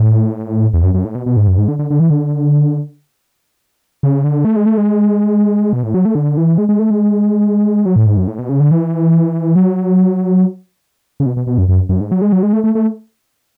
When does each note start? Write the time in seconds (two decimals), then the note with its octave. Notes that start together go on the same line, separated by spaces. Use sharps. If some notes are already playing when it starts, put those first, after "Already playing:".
Already playing: A2
0.74 E2
0.83 F#2
0.94 F#2
1.05 A2
1.15 B2
1.26 B2
1.37 G#2
1.48 F#2
1.58 G#2
1.68 D3
1.79 D3
1.90 D3
2.00 E3
2.10 D3
4.03 C#3
4.24 D3
4.45 A3
4.56 G#3
4.66 A3
4.77 G#3
5.73 B2
5.83 A2
5.94 F#3
6.05 A3
6.15 D3
6.37 E3
6.58 G#3
6.69 G#3
6.79 A3
6.91 G#3
7.86 F#3
7.96 A2
8.06 G#2
8.17 F#2
8.28 A2
8.39 B2
8.49 C#3
8.60 D3
8.71 E3
9.56 F#3
11.20 C#3
11.26 B2
11.37 B2
11.47 B2
11.58 F#2
11.69 F#2
11.89 F#2
12.00 G#2
12.12 F#3
12.22 G#3
12.32 F#3
12.43 G#3
12.53 A3
12.64 A3
12.75 A3